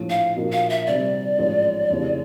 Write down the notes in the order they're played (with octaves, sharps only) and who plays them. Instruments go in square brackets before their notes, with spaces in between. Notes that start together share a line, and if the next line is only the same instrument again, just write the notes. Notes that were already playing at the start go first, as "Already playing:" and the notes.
Already playing: [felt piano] A#1 A2 F3
[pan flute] F5
[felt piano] A#2 F3 A#3 D#4 F#4
[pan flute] F5
E5
[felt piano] C3 D#3 G3 [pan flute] D5
[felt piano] A1 G#2 F3
F1 D#2 C#3 E3